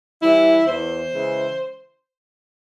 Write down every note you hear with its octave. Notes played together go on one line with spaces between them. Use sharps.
E3 G3 E4
E2 C5
C#3 E3 G#3